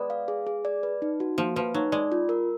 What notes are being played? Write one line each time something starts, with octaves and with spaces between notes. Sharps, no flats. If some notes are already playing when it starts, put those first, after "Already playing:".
Already playing: G#3 B3 D5
F5
G#4
G#4
D5
B4
D#4
F#4
F3 A#3
F3 B4
F#3 D#4
G#3 D5
F4
A#4